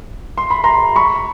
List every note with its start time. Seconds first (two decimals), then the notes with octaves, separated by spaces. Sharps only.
0.38 C6
0.50 B5
0.64 A#5 C6
0.96 B5 C#6